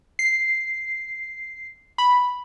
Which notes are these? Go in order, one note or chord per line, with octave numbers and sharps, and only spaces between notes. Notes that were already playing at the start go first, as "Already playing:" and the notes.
C7
B5